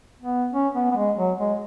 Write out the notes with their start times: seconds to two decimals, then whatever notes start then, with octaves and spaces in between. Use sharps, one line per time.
0.22 B3
0.53 C#4
0.75 B3
0.91 B3
0.96 G#3
1.17 F#3
1.39 G#3